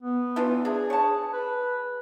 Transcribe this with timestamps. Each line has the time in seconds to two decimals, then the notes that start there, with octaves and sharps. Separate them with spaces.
0.02 B3
0.36 E3 D4 F4
0.65 D4 G#4
0.90 C#5 A5
1.33 B4